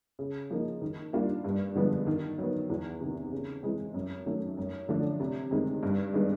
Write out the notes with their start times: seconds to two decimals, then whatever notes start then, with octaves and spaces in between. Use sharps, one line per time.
0.19 C#3
0.50 F3 A#3 D#4
0.82 D#3
1.13 G3 A#3 D4 F4
1.44 G2
1.75 D3 F3 G#3 B3
2.07 D#3
2.38 F#3 B3
2.70 E2
3.01 C3 D#3
3.32 C#3
3.63 E3 G#3 C4
3.94 F#2
4.26 D#3 F#3 A3
4.57 F#2
4.89 D3 F3 A3 D4
5.20 C3
5.51 D#3 G#3 C4
5.83 G2
6.14 D#3 G#3 B3 D4